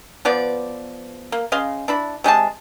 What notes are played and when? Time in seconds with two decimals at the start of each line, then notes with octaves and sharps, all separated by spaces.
0.25 F3 B3 D5
1.32 A#3
1.52 C#3 D#5 F5 C6
1.88 D4 E4 B5
2.24 C3 G#3 C#4 A5